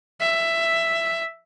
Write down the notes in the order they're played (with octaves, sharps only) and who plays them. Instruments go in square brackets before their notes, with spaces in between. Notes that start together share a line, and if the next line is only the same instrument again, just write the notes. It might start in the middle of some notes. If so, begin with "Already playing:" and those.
[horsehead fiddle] E5